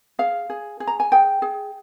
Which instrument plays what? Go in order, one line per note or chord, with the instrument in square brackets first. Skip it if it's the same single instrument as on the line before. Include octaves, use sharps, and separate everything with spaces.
[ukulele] G#4 F5
G#4
G#4
A#5
G#5
G#4 G5
G#4